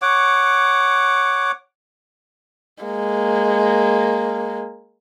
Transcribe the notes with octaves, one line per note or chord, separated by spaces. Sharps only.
C#5 F#5 D6
G#3 A#3